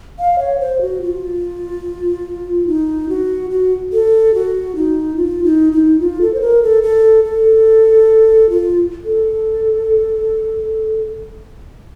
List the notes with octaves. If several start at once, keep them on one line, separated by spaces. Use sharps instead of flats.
F5
C#5
C5
F#4
F4
D#4
F#4
F#4
A4
F#4
D#4
F4
D#4
D#4
F4
A4
C5
A#4
A4
A4
A4
F4
A4